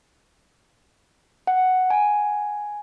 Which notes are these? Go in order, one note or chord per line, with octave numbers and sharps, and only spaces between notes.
F#5
G#5